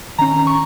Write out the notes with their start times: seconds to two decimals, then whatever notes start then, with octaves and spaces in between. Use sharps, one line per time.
0.18 D#3 C#4 A#5
0.47 C#6